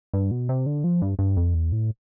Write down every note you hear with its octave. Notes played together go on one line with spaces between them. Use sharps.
G2
B2
C3
D3
F3
G2
G2
F2
E2
A2